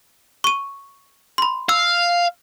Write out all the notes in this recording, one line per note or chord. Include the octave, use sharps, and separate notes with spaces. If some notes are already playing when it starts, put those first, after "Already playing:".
C#6 D#7
B5 C6
F5 E6